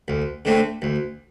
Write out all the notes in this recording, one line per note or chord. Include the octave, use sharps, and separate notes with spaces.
D2
D3 A3 C4
D2